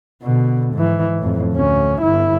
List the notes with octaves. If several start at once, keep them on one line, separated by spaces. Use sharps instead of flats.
B2 D3
G#2 E3
F2 A2
D2 C#4
G1 E4